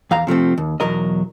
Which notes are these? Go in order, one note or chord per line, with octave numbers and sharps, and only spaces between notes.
E2 F5 A#5
C3 F3 A3 C4
D#2
B1 E2 F#3 A#4 D#5